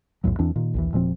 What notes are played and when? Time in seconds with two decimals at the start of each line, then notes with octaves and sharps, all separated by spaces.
0.24 B1 E2 A2 F#3
0.39 E2 E3 C4 D4
0.56 A#2 D#3
0.74 A#1 D#2 E3
0.93 E1 A#2 F3 C4